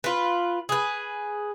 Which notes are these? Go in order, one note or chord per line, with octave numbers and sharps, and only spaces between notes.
F4 B4
G#4 B4